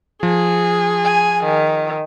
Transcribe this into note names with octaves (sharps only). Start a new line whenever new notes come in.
F3 G#4
G#5
D#3